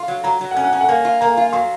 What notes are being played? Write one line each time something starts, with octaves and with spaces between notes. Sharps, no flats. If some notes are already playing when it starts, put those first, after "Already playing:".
Already playing: F4 C6
F#3
F#3 A#5
F#3
F#5
C#4 G#5
F#5
C#4 G#5
F#5
A#3 G#5
F4
A#3 A#5
F4
F#3 C6